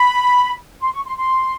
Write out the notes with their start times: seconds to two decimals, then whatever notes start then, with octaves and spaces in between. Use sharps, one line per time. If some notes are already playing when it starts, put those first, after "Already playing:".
Already playing: B5
0.81 C6
0.92 C#6
1.06 C6
1.17 C6